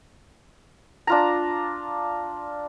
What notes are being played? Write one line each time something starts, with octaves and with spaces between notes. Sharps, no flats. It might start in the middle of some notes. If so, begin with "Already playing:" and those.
D4 F4 A#5